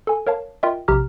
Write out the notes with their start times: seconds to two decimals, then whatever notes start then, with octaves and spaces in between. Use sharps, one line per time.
0.07 A4 G#5
0.27 A#4 C#5 F5 A5
0.63 F4 A#4 D#5 E5 G5
0.88 A#1 C3 G4 A#5 F6